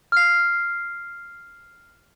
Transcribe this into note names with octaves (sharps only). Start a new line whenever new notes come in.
F6 C7